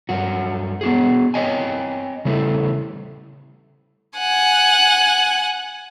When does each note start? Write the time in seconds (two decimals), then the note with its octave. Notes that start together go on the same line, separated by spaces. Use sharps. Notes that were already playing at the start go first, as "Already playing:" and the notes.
0.09 G2 F#3 F#4
0.81 B3 F#4 G#4
1.34 C4 C#5 D#5 G5 G#5
2.25 C#3 G3 A3 E4
4.19 F#5 G#5